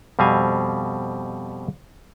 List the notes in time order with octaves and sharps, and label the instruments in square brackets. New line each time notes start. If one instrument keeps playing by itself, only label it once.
[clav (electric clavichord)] F2 B2 G3 C4 F5 G#5